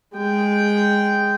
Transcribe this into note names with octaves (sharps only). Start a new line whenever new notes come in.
G#3 G5